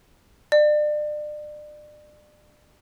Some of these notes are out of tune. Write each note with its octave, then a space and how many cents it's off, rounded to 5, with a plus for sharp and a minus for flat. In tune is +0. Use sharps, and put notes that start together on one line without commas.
D5 +35